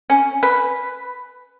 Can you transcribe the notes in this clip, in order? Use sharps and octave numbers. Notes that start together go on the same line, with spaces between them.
C#4
B4